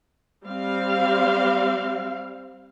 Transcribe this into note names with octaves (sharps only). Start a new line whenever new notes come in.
G3 C4 F5